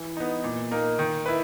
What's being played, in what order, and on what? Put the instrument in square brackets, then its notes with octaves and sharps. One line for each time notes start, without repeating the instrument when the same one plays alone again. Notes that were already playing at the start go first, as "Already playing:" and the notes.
Already playing: [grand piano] E3
B3 D#4
A#2
A#3 D#4 A#4
D#3
E4 B4